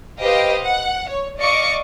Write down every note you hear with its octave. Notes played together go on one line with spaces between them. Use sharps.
G4 B4 C5 D#5 F5 G5
F#5
C#5
D5 D#5 F5 C#6 D6 C#7